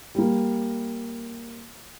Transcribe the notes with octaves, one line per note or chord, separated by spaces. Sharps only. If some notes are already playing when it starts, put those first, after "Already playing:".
G3 A#3